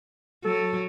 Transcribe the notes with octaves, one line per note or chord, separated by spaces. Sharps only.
F#3 A4